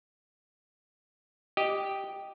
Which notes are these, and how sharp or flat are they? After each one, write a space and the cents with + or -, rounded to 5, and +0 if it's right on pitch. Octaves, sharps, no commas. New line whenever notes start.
G4 +0 D#5 +0